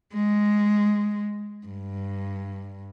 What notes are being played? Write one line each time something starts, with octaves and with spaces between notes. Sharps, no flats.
G#3
G2